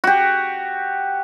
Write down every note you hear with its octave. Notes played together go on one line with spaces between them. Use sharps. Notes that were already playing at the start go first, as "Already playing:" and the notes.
F#4 G4